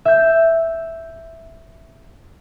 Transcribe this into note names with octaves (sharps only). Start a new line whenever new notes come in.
E5 G6